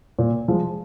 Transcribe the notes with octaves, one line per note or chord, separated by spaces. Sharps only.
A#2
F3 G#3